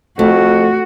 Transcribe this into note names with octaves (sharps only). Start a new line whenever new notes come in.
F2 A3 F#4